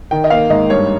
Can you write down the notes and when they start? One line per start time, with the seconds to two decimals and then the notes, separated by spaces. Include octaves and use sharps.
0.11 D#3 G5
0.24 D#5
0.30 A#3 F5
0.50 G#2 D#5
0.70 G2 C#5